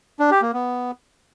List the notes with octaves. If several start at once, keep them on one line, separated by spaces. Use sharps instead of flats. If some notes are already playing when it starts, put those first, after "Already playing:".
D4
G4
A#3
B3